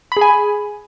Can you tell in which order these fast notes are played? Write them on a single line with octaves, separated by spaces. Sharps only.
B5 G#4 G#5